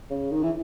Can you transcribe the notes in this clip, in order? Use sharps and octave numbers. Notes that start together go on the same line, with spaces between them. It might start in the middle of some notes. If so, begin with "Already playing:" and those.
C#3
D#3
E3